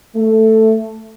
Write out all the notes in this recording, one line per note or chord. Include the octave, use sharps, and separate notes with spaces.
A3